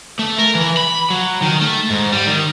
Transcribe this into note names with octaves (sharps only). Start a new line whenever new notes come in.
A3
A#4
E3
B5
F#3
D#3
A3
G#2
G3
D#3